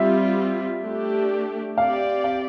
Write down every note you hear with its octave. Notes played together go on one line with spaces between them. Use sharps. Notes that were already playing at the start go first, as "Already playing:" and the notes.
Already playing: G3 C4 F4 E5
A3 D4 G4
C4 G4 D5 F5
F5